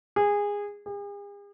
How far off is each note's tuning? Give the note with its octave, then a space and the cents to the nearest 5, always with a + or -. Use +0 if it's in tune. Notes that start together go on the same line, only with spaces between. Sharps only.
G#4 -20
G#4 -45